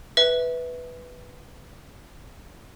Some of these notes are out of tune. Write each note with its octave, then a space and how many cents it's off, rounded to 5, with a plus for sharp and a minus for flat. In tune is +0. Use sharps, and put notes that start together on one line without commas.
B4 +0 E5 -20